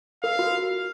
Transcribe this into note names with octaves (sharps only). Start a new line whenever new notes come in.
A#4 F5
F#4